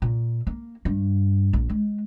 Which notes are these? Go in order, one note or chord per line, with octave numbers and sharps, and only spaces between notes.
A#2
A#3
G2
A#1
G#3